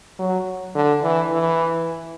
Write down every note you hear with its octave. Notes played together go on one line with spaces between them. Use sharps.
F#3
D3
E3
E3